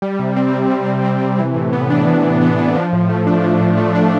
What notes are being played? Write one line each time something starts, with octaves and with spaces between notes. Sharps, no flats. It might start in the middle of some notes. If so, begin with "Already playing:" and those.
G3
C3
C4
C3
G3
C3
C4
C3
E3
A2
B3
D4
E3
A2
B3
D4
F3
A2
A3
D4
F3
A2
A3
D4